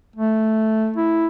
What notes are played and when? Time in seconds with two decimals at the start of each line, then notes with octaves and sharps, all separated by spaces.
0.16 A3
0.96 E4